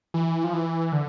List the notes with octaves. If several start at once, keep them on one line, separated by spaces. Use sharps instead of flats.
E3
F3
E3
D3